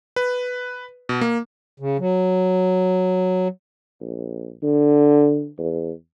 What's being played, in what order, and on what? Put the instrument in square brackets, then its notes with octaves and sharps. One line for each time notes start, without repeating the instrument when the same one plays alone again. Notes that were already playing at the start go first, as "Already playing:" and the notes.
[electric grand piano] B4
B2
A#3
[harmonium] C#3
F#3
[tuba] A#1
D3
E2